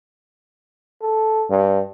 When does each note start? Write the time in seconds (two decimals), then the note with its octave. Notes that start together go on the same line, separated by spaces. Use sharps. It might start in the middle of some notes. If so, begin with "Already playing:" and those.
1.02 A4
1.50 G2